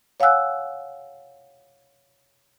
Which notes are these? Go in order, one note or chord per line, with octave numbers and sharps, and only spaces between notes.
C#5 F5 F#5 G#5 E6 F#6